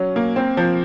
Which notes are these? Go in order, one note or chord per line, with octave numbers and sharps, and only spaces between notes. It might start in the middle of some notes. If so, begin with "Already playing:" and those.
Already playing: F#3 C#4
A#3
C4
F3